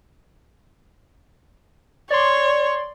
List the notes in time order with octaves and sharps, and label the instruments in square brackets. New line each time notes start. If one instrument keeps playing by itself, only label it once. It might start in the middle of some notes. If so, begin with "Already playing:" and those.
[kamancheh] C#5 [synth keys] D5 C6